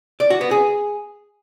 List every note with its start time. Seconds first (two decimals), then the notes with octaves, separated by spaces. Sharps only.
0.20 D5
0.30 F#4
0.41 B3
0.51 G#4